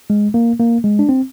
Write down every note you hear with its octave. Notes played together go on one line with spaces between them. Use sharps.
G#3
A#3
A#3
G#3
D4
C4